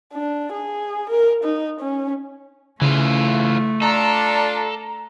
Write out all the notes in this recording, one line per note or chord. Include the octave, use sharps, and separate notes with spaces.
D4
G#4
A#4
D#4
C#4
C#3 E3 A3 F4
D4 F4 A4 D5 A#5